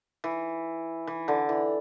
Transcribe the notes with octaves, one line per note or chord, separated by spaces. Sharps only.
E3
E3
D3
E3